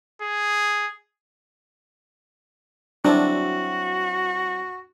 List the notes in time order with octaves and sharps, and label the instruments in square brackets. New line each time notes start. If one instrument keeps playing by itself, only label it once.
[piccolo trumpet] G#4
[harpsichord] F#3 C4 E4 [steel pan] D4 [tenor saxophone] F#4